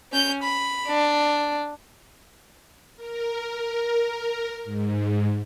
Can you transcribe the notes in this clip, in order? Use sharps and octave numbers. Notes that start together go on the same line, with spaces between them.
C#4 G6
B5
D4
A#4
G#2